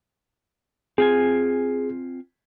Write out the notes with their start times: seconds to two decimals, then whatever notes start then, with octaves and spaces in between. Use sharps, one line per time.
0.98 C4 F4 G#4 G#5